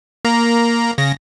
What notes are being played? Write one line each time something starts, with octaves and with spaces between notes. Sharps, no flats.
A#3 A#5
C#3 A#6